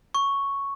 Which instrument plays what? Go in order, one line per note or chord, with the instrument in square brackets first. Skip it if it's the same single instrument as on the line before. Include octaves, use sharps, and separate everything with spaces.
[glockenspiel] C#6